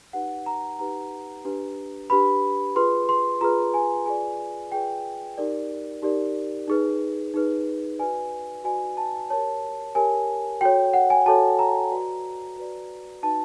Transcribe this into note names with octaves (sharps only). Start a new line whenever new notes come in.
D#4 G4 B4 F#5
A#5
D#4 G4 B4 A#5
D4 G4 B4
D4 G4 B4 B5
F4 G#4 B4 C6
C6
F4 G#4 B4 A#5
G#5
F4 G#4 B4 D5 G#5
F4 G#4 B4 D5 G5
D#4 G4 A#4 D5
D#4 G4 A#4 D5
D#4 G#4 B4
D#4 G#4 B4
F#4 B4 D5 G#5
F#4 B4 D5 G#5
A5
G4 A#4 C#5 A5
G4 A#4 C#5 G#5
F#4 A4 C#5 G5
F#5
G#5
F#4 A4 C#5 A5
A#5
F#4 B4 D5
F#4 B4 D5
D#4 F#4 B4 A5